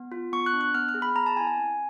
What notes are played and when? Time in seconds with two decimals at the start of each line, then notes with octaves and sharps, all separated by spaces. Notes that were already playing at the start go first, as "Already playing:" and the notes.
Already playing: B3
0.12 F4
0.33 B3 C#6
0.46 F#6
0.53 D4
0.61 F#6
0.75 B3 F6
0.89 F6
0.94 G#4
1.02 B5
1.15 B3 A#5
1.26 A5
1.36 E4 G#5
1.47 G#5
1.57 C4